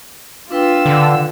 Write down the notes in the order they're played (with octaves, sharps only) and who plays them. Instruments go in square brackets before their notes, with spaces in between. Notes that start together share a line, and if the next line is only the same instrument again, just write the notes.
[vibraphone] D4 B4 G5 [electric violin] F4 E6
[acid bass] D3